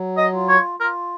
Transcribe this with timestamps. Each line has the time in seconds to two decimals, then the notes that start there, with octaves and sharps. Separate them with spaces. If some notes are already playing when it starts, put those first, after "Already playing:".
Already playing: F#3
0.17 D#5
0.33 F4
0.49 C#5
0.80 F4 A#4